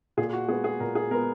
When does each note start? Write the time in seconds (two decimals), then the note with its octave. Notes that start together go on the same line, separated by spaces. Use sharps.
0.17 A#2 G#4
0.33 F#4
0.48 G#3 B3 G#4
0.64 G#4
0.80 A#2 A#4
0.95 G#4
1.11 G#3 A#4
1.14 B3